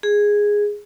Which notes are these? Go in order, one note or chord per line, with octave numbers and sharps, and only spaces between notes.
G#4